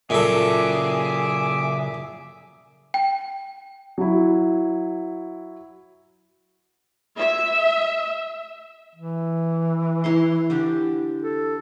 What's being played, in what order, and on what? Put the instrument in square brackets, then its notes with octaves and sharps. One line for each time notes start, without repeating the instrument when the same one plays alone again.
[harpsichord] A#2 A4 [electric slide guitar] C#3 F#3 [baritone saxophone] G#4 [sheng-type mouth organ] E5 D6
[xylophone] G5
[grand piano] F#3 E4
[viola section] E5
[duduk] E3
[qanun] E4 C#5 C6
D3 D4 G4
[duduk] A4